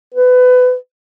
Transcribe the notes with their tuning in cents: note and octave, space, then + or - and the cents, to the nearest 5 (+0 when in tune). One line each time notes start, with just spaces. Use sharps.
B4 +25